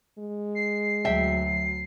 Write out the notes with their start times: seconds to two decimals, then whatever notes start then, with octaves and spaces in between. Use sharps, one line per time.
0.19 G#3
0.55 C7
1.05 D2 F#3 E5 G5